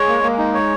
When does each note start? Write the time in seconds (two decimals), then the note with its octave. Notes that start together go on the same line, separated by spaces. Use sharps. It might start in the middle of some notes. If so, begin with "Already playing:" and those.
Already playing: G#3 C#5
0.08 A#3
0.23 A#3
0.39 D#4
0.54 C#5